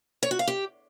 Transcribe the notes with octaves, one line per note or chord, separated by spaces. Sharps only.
C#5
F#4
F5
G4